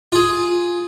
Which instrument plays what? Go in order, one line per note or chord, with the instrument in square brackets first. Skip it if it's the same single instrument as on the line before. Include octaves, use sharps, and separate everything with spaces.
[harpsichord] F4 G#4